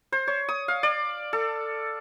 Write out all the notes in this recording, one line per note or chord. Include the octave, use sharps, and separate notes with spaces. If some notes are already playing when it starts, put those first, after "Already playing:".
C5
C#5
D#6
F5
D5
A4